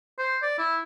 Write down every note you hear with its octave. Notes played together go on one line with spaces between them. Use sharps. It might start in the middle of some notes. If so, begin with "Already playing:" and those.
C5
D5
E4